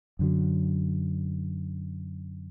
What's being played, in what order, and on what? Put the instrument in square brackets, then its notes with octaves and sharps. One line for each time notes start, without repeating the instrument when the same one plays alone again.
[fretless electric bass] F#2 D3 F#3